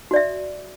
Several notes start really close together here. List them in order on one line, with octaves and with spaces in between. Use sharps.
F#4 D5 E5